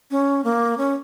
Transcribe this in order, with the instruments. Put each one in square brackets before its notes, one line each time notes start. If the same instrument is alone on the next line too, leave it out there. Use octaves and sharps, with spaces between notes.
[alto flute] C#4
A#3
C#4